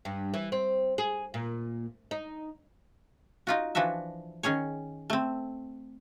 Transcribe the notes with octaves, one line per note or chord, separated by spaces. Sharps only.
G2
E3
C4
G#4
A#2
D#4
D#4 F4 F#4
E3 F3 D4 F#4 E5
D#3 C#4 G#4 C#5
A3 C4